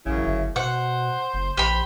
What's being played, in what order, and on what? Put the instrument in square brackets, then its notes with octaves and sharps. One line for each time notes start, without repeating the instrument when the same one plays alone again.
[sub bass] A1 [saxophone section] F#2 C#3 E4
[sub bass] G1
[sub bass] B2 [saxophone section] C5 [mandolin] F#5
[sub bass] F#1
[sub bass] A#1 [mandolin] G4 B5